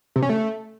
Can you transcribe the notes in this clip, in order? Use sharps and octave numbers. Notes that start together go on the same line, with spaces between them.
C3
C#4
A3